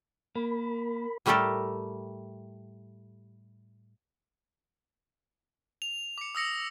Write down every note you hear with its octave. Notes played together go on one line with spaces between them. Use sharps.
A#3 A#4 B5
A2 G3 A3 G4 A4 A#4
F7
D6 C#7
D#6 E6 A#6 C#7